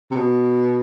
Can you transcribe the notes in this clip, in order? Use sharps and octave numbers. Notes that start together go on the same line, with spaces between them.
C3
B2